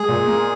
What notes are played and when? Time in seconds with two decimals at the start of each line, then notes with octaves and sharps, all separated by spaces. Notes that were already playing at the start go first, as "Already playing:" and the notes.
Already playing: G#3 G#4
0.08 A#2
0.27 A#3